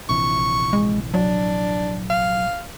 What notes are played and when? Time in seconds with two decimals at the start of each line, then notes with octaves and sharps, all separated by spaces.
0.09 A#1 C3 E3 C#6
0.73 G#3
1.14 F#3 D4
2.10 F5